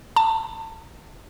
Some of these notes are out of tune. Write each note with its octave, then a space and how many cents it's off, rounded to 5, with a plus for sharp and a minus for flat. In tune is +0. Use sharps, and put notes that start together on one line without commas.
A5 +25